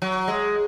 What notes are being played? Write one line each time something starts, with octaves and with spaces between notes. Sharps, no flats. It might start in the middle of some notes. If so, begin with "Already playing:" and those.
F#3
G#3